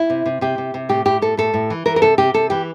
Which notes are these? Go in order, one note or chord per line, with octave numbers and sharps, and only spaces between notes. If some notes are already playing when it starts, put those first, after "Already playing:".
Already playing: E4
C3
C3
C3 G4
C3
C3
A2 G4
A2 G4
A2 A4
A2 A4
A2
E3
E3 A#4
A#4
C3 A4
C3 G4
C3 A4
E3 G4